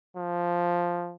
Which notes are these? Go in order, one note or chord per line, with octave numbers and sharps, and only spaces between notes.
F3